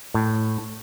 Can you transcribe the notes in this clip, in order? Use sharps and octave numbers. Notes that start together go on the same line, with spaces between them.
A2